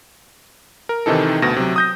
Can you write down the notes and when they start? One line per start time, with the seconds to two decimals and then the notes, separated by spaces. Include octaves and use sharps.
0.89 A#4
1.06 C3 D#3 E3 D#4 A4
1.42 D2 B2 A#6
1.56 C3 F#3
1.76 D#6 G6 A#6